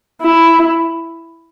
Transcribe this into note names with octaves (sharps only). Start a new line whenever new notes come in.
E4